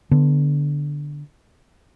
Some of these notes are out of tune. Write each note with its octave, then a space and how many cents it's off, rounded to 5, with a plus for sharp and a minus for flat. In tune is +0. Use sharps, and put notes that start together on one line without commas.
D3 +0 B3 +0